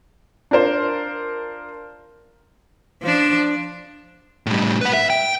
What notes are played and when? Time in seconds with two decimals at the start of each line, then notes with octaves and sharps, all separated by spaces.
0.51 D4 F4 A#4 C5
3.02 F3 D4
4.46 A2 G3
4.81 B4 F#5
4.93 E5
5.10 G5